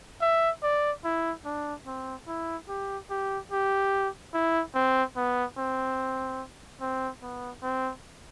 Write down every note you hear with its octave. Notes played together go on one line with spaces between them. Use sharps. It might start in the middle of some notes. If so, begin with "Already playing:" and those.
E5
D5
E4
D4
C4
E4
G4
G4
G4
E4
C4
B3
C4
C4
B3
C4